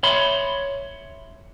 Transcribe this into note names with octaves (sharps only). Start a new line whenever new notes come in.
C#5 E5 B5 C6